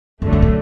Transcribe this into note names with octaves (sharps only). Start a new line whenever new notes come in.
F#2 D3 F#3 A3
F#2
A2